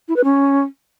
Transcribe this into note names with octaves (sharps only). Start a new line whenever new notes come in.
E4
B4
C#4